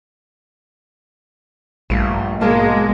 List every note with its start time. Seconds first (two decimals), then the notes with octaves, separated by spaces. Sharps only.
1.90 A#1 G2 A3 F4
2.41 G#2 B2 G#3 A#3 A5